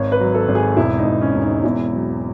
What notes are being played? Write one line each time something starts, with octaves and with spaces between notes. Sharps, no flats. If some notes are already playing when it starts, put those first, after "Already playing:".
Already playing: G#1 C#5
B4
F#3
A4
G#1
G#4
E1 E4
D#4
E1
C#4
E1
D#4
E2 E4
F#3